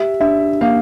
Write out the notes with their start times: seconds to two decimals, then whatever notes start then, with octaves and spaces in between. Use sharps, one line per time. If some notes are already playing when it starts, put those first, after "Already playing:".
Already playing: G4 E5
0.20 D4 E5
0.61 A#3 F5